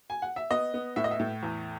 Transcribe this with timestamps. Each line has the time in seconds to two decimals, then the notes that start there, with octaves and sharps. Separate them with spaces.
0.10 G#5
0.22 F#5
0.36 E5
0.51 B3 D#5
0.74 B3
0.96 A2 E5
1.04 D#5
1.11 E5
1.19 A2
1.43 E2